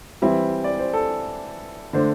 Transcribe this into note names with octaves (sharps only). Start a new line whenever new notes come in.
E3 G3 C4 E4 E5
D5
C5
A4
D3 A3 D4 C5